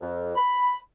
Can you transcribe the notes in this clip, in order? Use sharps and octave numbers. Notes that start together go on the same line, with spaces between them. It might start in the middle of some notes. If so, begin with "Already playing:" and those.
F2
B5